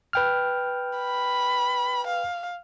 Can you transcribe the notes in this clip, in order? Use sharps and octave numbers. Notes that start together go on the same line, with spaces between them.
B4 G5 F6
B5
F5